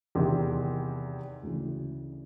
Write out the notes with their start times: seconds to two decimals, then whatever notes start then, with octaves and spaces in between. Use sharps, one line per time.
0.15 E2 C3 D#3
1.43 D2 C#3 E3